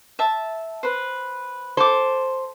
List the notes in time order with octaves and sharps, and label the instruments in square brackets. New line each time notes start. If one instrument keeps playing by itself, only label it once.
[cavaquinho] E5 A5
B4 C5
[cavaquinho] A4 D6 [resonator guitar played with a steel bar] C5